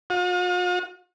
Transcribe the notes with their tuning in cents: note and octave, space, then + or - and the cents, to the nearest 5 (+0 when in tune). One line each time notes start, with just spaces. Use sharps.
F4 +45